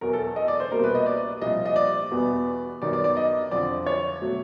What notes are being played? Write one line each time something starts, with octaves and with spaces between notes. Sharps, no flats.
E2 B2 F#3 A#4
A4
D#5
D5
C5
C2 B2 G3 A#3 A#4
B4
D#5
D5
C2 A#2 F3 D#5
D#5
D5
E2 B2 G3 B3
F#2 D#3 G3 B3 D5
D5
D5
D#5
F2 D3 F3 D5
C#5
B2 F#3 A3